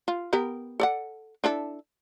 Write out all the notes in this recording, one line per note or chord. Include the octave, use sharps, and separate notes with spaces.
F4
B3 G4 A#4
A4 D5 F#5
D4 E4 A4